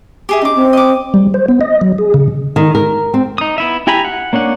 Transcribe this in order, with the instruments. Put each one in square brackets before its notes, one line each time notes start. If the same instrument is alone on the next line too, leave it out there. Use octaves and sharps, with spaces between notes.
[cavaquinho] G4 G#4 E5
[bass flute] C#4 [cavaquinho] D#4 D6
[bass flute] C4
[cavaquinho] D#5 D6
[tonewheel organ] G3
C5
B3
D#5
F#3
G#4
C#3
[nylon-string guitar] D#3
A#4
C4
[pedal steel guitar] D#4 D#6
B3 E4 E5
E4 G4 G#5 A#5 B5
F#5
A#3 C#4 D4 F#5